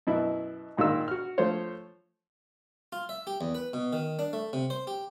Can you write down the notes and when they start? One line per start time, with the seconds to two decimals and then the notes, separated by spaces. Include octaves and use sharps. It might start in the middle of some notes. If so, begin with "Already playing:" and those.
0.07 F#2 B2 E4
0.77 G#1 A#2 D#3 F4 E6
1.08 F#4 F6
1.38 F3 A3 F4 C5 C#5
2.92 F4
3.09 E5
3.27 G4
3.41 E2
3.55 B4
3.73 B2
3.93 D#3
4.19 D4
4.33 A3
4.53 C3
4.70 C5
4.87 G4